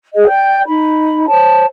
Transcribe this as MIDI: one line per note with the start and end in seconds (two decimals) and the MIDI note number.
0.13 0.25 68
0.13 0.25 75
0.27 0.61 74
0.27 0.61 79
0.27 0.61 91
0.66 1.24 63
0.66 1.24 83
1.28 1.64 72
1.28 1.64 73
1.28 1.64 81